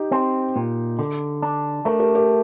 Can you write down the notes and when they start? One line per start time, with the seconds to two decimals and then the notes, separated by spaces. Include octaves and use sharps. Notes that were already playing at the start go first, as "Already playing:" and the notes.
Already playing: D#4 G4
0.11 C4
0.56 A#2
0.99 D3
1.42 D4
1.85 A3 A#4
1.99 G4 A#4
2.15 G4 A#4